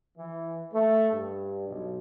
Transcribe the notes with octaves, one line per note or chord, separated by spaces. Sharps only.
E3
A3
G2
B1